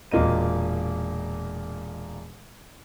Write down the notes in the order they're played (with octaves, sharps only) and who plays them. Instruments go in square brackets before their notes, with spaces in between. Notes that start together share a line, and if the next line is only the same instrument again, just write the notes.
[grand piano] E1 A#2 A#3 D#5 D#7